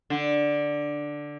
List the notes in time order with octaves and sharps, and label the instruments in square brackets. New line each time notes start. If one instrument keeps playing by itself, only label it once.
[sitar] D3